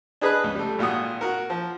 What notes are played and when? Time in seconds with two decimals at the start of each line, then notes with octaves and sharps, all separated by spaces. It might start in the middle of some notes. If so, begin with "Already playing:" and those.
0.21 D4 G#4 B4 D#5 B5 F#6
0.44 C#2
0.55 G3 A3
0.79 G#1 A#2 F#4 D#6
1.21 F#4 A#4
1.50 F3